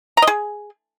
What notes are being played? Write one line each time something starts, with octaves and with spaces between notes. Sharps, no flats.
A#5
D#5
G#4